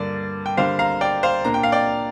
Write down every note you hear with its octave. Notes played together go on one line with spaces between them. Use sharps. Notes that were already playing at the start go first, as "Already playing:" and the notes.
Already playing: G2 D3 A#3 D5
G5
D3 G3 A#3 D4 C5 F5
F5 A#5
D5 G5
C5 F5
A#2 A#3 D4 A#5
G5
F5
D5 G5